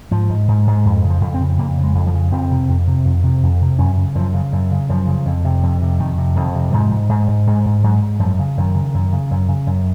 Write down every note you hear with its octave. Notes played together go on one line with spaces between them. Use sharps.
G#2 F3
G#2
G#2
G#2
F2
C#3
F3
F2
C4
C#3
F2 A#3
C#3
G#3
F2
F3
C#3
F2 C4
C3
F2
C3
F2
C3
F2
C3
F#2 C#4
C#3
F#2 F3
C#3
F#2
C#3
F#2 F3
C#3
F2
C3
F2
C3
F2 D#3
C3
F2 D#3
C3
G#2 F3
G#2
G#2
G#2
G#2 G#3
G#2
G#2 F#3
G#2
F#2 F3
C#3
F#2 D#3
C#3
F#2
C#3
F#2
C#3
F#2